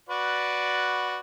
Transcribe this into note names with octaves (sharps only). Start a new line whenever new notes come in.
F#4 B4 D5